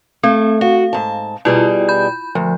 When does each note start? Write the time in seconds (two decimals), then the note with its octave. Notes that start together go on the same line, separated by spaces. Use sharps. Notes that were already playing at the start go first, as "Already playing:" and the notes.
0.23 A3 C4
0.61 F#4 F5
0.93 G#2 A5
1.45 B2 G3 E4 F4 G#4
1.89 B5 G6
2.35 D2 F3